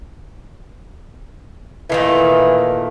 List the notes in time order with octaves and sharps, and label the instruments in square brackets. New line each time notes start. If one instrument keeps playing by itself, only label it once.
[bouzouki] A#2 D#3 A3 [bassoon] E3